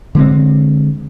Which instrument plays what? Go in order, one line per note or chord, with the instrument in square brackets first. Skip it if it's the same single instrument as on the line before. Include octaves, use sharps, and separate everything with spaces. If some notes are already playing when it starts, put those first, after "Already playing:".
[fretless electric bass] D3 G#3 C4